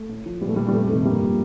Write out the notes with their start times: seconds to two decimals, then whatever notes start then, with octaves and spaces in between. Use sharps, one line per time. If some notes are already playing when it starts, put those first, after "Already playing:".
Already playing: A3
0.09 A2
0.26 F3
0.41 A#2 G3
0.49 A3
0.56 G3
0.68 G3
0.73 F2 A3
0.89 C3 D#3 G3 A3
1.05 G2 G3 A#3
1.22 F3